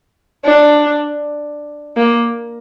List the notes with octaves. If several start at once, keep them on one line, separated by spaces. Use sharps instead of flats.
D4
A#3